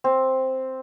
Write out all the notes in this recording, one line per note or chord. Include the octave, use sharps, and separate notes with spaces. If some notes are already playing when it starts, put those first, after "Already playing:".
C4